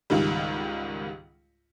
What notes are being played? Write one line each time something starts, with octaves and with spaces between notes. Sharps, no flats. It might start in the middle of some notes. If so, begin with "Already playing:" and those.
C#2 G#2 D#3 G3